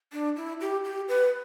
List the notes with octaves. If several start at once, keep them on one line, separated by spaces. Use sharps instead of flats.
D4
E4
G4
G4
B4